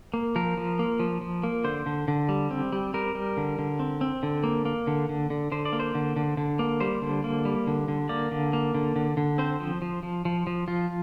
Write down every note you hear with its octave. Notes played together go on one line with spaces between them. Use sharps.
A#3
F3 A#4
F3
A#3
F3
F3
A#3
D3 C5
D3
D3
G3
C4
G3
G3 A#4
G3
D3
D3
C4
C4
D3
A#3
A#3
D3
D3
D3
D3 C5
D5
A#3
C5
D3
D3
D3
A#3
G3 C5
D3
A#3
G3
D3
D3
A#3 D5
D3
A#3
D3
D3
D3
C4 C5
F3
F3
F3
F3
F3
F3 F4